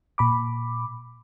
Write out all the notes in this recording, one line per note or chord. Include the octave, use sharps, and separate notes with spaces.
A#2 B5 D6